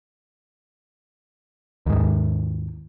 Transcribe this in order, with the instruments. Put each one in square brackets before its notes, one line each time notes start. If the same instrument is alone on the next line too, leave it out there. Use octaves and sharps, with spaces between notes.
[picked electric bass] D#2 G#2